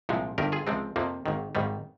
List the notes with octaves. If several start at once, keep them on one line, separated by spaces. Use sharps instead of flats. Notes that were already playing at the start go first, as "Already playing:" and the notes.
C2 A#2 F3 G#3
G1 G2 D#3 G4 A#4
F4 G#4
C#2 C3 F3 G#3 C4
F2 C3 F3 A#3
G#1 G#2 D#3
G#1 G#2 D#3 G3